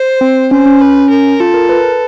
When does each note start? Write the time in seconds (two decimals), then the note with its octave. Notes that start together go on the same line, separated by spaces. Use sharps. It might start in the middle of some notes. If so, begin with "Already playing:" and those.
Already playing: C5
0.21 C4
0.51 C#4 C5
0.66 C#4
0.81 B4
1.10 A#4
1.40 F4 A4
1.54 A#4
1.69 B4